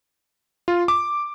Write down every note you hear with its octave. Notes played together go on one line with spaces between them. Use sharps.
F4
D6